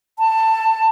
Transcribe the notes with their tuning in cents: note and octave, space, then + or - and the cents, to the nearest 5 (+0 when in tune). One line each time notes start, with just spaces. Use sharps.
A5 +15